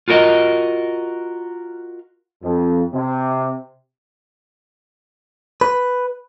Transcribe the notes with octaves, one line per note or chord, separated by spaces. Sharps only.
F4 F#4 A#4 C#5 D#5
F2
C3
B4